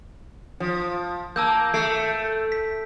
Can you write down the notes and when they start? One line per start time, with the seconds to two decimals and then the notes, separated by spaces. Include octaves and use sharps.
0.60 F3
1.36 A#3 A5 E6 G6
1.74 A3 C7 D7
2.52 B6